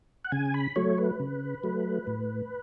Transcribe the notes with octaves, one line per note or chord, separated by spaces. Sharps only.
F#5
C#3 G#5
B5
F#3 A3 C#5
B4
C#3
F#3 A3
A2